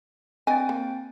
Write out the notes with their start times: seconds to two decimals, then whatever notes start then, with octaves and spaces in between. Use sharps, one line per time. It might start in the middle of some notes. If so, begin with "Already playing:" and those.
0.47 D3 C4 D#5 G5 G#5 A6
0.69 A#3